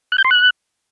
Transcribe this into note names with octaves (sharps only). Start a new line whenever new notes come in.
F#6
G6
C6
F#6